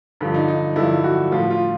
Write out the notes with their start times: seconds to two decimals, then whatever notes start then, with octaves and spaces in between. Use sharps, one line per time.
0.21 G2 D3 F3
0.34 D#4
0.48 D#4
0.76 G2 D3 F3 E4
1.04 F#4
1.31 A2 F3 F4
1.50 F4